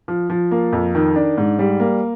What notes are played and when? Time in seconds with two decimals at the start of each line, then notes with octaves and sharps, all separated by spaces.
0.08 F3
0.30 F3
0.51 A#3
0.73 F2
0.95 D#3
1.16 D4
1.38 G#2
1.59 G3
1.80 A#3